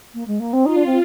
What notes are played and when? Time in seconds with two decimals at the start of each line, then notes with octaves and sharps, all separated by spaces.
0.14 A#3
0.27 G#3
0.40 A#3
0.53 C4
0.65 D#4 F4
0.76 D4
0.86 C4